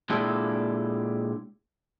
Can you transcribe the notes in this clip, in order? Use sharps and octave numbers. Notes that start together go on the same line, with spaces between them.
A#2 G#3 D4 E4 G4 A4